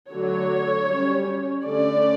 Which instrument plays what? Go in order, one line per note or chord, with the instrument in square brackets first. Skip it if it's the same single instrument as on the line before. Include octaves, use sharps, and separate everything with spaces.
[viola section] D3 F#3 A3 C#5
G3 C#4
D3 A3 C#4 D5